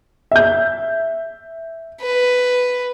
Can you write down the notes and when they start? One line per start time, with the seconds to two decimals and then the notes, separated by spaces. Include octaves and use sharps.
0.31 E5 G6
2.01 B4